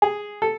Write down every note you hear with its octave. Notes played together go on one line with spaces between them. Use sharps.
G#4
A4